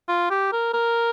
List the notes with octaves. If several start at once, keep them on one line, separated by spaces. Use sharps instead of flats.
F4
G4
A#4
A#4